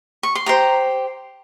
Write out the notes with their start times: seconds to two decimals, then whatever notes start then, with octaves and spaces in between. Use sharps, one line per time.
0.23 C#6
0.35 C6
0.46 G4 C5 A#5